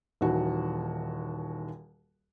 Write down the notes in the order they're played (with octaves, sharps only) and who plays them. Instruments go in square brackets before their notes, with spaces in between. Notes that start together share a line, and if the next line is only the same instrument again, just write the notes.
[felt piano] D#1 D#2 E3 F#4